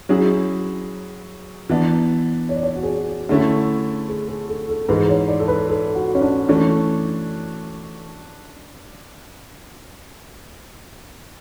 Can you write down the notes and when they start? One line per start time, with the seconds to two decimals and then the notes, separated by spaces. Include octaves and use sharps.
0.09 F#3 C#4 E4 G#4
1.69 E3 B3 D4
2.49 C#5
2.56 D5
2.63 C#5
2.76 F#4
2.83 G#4
2.90 F#4
3.29 D3 A3 C#4 E4
4.08 G#4
4.28 G#4
4.49 A4
4.69 A4
4.89 G#2 E3 G#3 B4
5.09 C#5
5.28 D5
5.40 A4
5.48 B4
5.69 A4
5.95 F#4
6.15 C#4
6.22 D4
6.49 E3 A3 C#4 D4